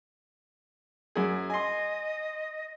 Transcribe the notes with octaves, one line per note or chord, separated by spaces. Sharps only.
F#2 G#4
D#5 G#5 C6